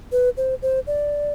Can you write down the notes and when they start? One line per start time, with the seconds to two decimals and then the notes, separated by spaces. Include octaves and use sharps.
0.12 B4
0.37 C5
0.62 C5
0.87 D5